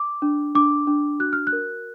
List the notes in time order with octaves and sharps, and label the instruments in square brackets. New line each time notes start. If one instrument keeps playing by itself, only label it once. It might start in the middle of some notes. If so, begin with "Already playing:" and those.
Already playing: [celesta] D6
D4
D4 D6
D4
F#4 F#6
F6
F#6
A#4